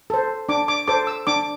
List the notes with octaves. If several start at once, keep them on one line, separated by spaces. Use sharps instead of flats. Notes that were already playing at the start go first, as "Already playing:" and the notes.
A4 C5
D4 D6
D6
A4 C5 D6
E6
D4 D6